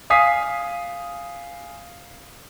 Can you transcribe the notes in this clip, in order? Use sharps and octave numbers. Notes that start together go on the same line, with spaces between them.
F5 G#5 D#6 B6 C7